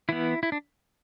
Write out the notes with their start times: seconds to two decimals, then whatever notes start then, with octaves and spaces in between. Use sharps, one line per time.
0.09 E3 B3 E4
0.43 E4
0.52 D4